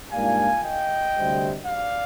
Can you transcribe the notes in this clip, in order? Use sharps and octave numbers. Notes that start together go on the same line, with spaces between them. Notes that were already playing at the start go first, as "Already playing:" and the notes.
G#2 G3 A#3 D4 F4 F5 G#5
D#5 G5
D2 C3 G3 C4
D5 F5